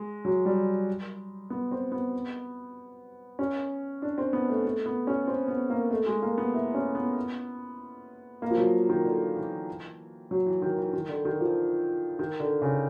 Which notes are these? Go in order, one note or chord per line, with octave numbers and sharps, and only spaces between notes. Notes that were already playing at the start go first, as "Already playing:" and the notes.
Already playing: G#3
F#3
G3
B3
C4
B3
C#4
D4
C4
B3
A3
A3
B3
C#4
C4
B3
A#3
A3
G#3
A#3
B3
E4
C#4
B3
A#3
F3
F#3
D#3
D3
E3
F#3
E3
D#3
E3
D#3
D3
D#3
F3
D#3
D3
C#3